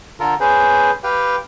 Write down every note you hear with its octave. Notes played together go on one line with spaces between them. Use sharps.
D3 F4 A4 A#4
C#4 G#4 B4 C5
G4 B4 F5 G5